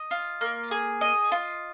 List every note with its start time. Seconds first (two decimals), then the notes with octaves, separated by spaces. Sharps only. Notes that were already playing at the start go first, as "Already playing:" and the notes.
Already playing: D#5
0.11 F4
0.41 A#3
0.71 G#4
1.01 D#5
1.32 F4